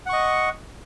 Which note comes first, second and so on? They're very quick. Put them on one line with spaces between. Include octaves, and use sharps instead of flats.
F#5 C#6 D#5